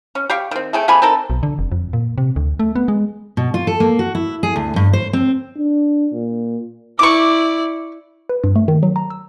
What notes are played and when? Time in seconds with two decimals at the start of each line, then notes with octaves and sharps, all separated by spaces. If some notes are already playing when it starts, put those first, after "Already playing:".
0.15 C#4
0.30 G4 F5 G5 C#6
0.51 D#3 C4
0.73 A3 G#4 G5
0.88 C3 A3 G#5 B5
1.02 C4 D#4 A4 A#4
1.30 B1
1.43 D3
1.59 F1
1.72 F2
1.93 A#2
2.18 C3
2.36 D2
2.60 A3
2.76 B3
2.88 G#3
3.37 B2
3.54 F4
3.67 A4
3.80 A#3
3.99 F#4
4.15 E4
4.43 G#4
4.56 D2
4.76 G2
4.93 C5
5.13 C4
5.58 D4
6.13 A#2
6.99 E4 D5 C#6 D6
8.29 B4
8.44 G2
8.56 A3
8.68 D#3
8.83 F#3
8.96 A#5
9.10 E6